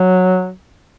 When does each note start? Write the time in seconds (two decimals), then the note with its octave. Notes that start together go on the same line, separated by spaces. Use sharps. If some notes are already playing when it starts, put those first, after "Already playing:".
Already playing: F#3